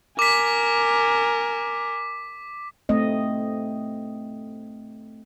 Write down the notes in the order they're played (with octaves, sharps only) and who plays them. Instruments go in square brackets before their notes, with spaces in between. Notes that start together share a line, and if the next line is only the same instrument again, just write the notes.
[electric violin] A#4 G#5 [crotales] D6 B6
[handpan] A3 C4 D#5